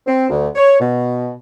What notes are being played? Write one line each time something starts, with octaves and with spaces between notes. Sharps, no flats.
C4
D2
C#5
B2